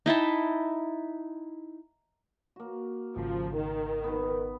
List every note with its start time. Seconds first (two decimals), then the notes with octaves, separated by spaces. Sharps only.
0.06 D#4 E4 G5 A5
2.56 A#3 F#4
3.16 G#1 C#3 F3
3.56 D#3
4.04 B3 B4